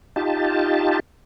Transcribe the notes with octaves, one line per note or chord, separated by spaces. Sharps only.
D#4 F4 G4 A5